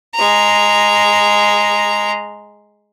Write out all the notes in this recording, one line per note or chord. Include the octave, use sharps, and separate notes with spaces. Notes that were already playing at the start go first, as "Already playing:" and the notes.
G#3 A#5